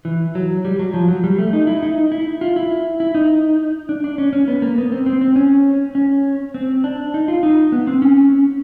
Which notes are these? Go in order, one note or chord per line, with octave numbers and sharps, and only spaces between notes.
E3
F#3
G3
F#3
F3
F#3
G3
A3
D#4
E4
D#4
E4
F4
E4
E4
D#4
D4
D4
C#4
C#4
B3
A#3
B3
C4
C4
C4
C#4
C#4
C4
D4
D#4
F4
D#4
B3
C4
C#4